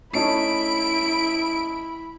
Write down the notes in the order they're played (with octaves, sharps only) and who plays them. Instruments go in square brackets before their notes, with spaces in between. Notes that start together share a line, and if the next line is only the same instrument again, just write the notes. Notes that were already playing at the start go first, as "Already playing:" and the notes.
[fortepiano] A3 C#4 D#4 [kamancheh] E4 B5 [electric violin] D7